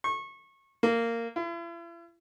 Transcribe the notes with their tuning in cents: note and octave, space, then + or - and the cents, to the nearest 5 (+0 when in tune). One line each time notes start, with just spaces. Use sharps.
C#6 -25
A#3 -15
E4 +45